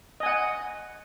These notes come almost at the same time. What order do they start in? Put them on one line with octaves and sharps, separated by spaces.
D#5 G#5 F#5